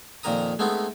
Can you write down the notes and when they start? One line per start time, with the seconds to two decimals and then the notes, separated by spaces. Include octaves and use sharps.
0.23 F2 A#2 D#3 A#4 A#5 D#6
0.59 G#3 A3 B3 C4 D#4